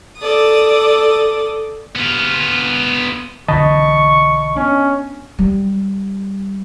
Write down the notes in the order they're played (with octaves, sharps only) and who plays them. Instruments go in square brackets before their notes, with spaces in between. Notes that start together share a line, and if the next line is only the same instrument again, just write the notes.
[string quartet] A4 D5 D#6
[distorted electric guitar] B3 F4
[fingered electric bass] B1 D3 E3 [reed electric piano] D#5 A5 B5 [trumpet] C#6
[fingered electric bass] B3 D4 [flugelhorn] C#4
[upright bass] G3